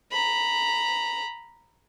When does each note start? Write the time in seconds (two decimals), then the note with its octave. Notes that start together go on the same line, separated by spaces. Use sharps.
0.11 A#5 B5